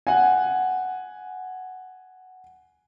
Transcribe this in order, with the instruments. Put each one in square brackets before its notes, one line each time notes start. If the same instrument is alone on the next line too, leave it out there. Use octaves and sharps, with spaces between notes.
[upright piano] F#5 G#5